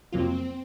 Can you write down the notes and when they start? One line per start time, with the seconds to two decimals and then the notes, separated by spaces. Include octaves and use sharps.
0.12 F2 C3 F#3 A#3 C4 F4